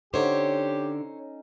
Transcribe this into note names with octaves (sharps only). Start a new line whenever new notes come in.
D3 C#4 D#4 G4 C5 C#5